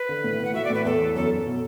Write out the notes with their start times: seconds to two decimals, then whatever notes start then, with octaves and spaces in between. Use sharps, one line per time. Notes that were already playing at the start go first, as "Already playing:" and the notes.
Already playing: B4
0.09 D3
0.24 A2
0.40 A2 F#5
0.54 F#4 E5
0.65 D5
0.70 A2 B4
0.85 E2 A4
1.01 E2
1.16 F#2 A4
1.31 F#2
1.46 B2